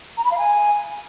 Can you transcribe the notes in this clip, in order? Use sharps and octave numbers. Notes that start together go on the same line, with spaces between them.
A#5
B5
F5
G#5